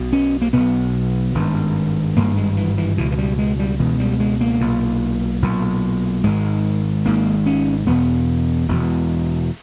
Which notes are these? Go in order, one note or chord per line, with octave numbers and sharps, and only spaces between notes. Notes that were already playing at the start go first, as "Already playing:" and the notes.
Already playing: B1 B2
C#4
A#3
B1 B2 B3
G#1 G2
G#1 G2 A#3
G#3
E3
E3
C#2 B2 E3
E3
G3
G#3
G3
C#2 B2 E3
G3
G#3
A#3
B1 A#2
B1 A#2
G#1 G#2 G#3
G#1 G#2 A#3
C#4
E1 E2 B2 B3
E1 E2 B2